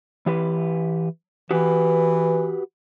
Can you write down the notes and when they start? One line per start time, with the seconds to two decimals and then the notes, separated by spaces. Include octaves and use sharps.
0.26 E3 G4 B4
1.51 E3 F#4 G4 B4